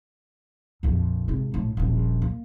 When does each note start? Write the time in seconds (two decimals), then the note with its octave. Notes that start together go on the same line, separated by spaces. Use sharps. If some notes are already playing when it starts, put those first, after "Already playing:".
0.83 A#1 F2
1.28 G#1 C3
1.54 A#1 A2
1.77 D#1 A#1
2.22 A#3